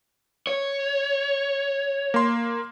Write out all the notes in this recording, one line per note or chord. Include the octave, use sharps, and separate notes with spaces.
C#5
A#3 C6